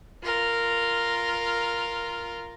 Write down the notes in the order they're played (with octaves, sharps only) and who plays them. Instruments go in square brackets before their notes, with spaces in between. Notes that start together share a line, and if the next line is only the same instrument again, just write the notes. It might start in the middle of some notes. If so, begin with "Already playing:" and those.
[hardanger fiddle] F4 A#4